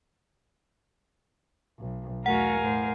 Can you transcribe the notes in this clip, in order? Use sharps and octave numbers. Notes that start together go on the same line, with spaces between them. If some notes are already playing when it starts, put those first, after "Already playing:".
B1
E2 A3 F#4 A#4 F5 F#5 G#5
A2 C5